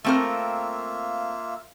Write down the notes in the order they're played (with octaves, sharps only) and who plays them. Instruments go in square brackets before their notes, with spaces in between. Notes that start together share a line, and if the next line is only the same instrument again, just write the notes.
[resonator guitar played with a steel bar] A3 C4 A#4 [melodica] A#3 F4 E5